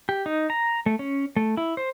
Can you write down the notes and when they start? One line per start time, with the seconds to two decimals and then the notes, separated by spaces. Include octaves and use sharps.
0.09 G4
0.26 D#4
0.50 A#5
0.86 A3
0.99 C#4
1.36 A3
1.57 E4
1.77 C5